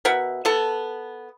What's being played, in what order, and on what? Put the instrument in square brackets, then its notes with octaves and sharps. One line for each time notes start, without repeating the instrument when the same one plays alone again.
[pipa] B2 A#4 E5 F#5
B3 A4 A5